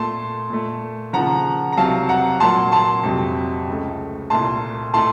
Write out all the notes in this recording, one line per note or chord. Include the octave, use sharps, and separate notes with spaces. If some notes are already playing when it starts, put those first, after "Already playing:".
Already playing: A#2 A3 A5 C6
A#2 A3
D#2 C#3 F3 F#5 A#5
A#5
C2 C3 F#3 F5 A5
F#5 A#5
A#2 F#3 A#3 A5 C6
A5 C6
F2 C3 F#3
C#2 C#3 A3
C2 A#2 A3 A5 C6
A2 A3 A5 C6